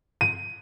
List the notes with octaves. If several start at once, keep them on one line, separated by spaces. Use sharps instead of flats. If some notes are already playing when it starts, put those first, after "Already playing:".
D#7